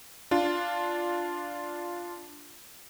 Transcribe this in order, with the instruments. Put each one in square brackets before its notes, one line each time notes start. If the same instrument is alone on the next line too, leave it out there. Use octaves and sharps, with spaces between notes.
[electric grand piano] D4 F4